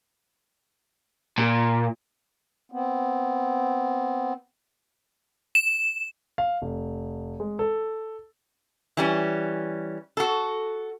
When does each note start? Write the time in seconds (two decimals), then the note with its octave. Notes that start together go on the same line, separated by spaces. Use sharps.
1.38 A#2
2.72 B3 C4
5.55 E7
6.38 F5
6.62 F1
7.40 G#3
7.59 A4
8.97 E3 G3 C#4
10.17 F#4 A4